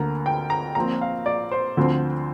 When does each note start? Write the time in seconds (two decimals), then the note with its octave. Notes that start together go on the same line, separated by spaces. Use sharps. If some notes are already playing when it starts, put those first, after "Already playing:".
Already playing: D2 D3 A#3 A#5
0.26 G5
0.50 A#5
0.75 A#1 A#2 F3 C4 A#5
1.01 F5
1.26 D5
1.51 C5
1.77 D2 D3 F3 C4